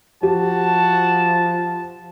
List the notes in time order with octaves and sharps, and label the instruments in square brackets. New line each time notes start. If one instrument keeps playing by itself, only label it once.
[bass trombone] F3 [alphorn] F#4 [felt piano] G4 [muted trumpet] A5